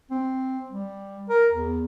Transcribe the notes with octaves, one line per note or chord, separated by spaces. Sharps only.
C4
G3
A#4
E2